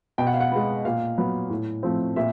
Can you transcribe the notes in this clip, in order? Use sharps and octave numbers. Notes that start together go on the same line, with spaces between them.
B2 G5
F#5
F5
F#5
G#3 B3
A#2 F5
F#3 B3
A2
F3 A3 C4
A#2 E5